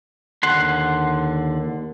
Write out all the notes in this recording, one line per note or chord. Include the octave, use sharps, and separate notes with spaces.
D#2 D3 F#5 C6